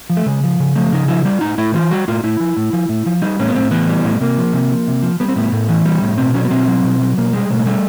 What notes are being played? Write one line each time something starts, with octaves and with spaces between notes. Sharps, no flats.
F3
A3
C#3 G#3
F3
C#3
F3 A3
C#3 D#4
F3 E4
G3 F4
A2 D#4
A2 E4
E3 F4
G3 F#4
A2 F4
A2 E4
F3
A2
F3
A2
F3
G3 D#4
A2 C#4
B3
A2 C4
E3 B3
G3
A2
C3 A#3
F3
C3
F3
C3
F3
G3 B3
C4
A2 B3
A2
E3
G3
A2
B2 C4
F#3 C#4
B3
B2 C4
F#3
B2
F#3
B2 A#3
G3 G#3
B2 A3
G#3
G3 A3